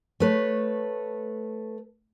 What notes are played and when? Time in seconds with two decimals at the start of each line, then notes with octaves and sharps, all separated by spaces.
0.20 A3 B4 C#5